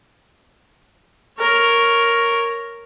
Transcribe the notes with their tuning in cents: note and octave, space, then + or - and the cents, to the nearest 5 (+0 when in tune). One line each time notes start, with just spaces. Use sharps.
A#4 +0 C#5 +0